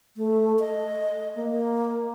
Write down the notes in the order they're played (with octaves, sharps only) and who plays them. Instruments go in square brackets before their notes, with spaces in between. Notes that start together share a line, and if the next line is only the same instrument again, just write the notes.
[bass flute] A3
D#5
A#3